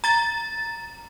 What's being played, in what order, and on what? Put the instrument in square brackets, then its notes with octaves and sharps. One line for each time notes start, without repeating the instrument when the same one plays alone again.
[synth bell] A#5 A6